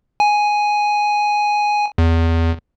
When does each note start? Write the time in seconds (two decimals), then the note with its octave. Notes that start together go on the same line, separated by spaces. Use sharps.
0.20 G#5
1.98 E2